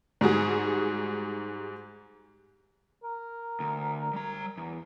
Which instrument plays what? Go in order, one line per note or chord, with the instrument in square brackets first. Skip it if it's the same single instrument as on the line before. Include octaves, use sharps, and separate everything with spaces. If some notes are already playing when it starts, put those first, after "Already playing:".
[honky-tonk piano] G#2 G3 F#4 G#4
[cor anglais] A#4
[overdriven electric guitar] D2
G3 A#5
E2